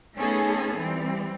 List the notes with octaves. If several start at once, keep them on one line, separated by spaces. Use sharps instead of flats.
A3 B3 C#4 D#4 G#4 A4
E3 G3 C4